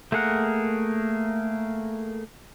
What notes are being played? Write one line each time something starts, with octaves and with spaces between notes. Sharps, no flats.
A3 A#3 G#4 A#4 F#5